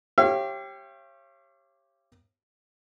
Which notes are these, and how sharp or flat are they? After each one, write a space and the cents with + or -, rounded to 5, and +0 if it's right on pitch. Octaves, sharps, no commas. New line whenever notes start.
G4 +0 C#5 -35 F5 -45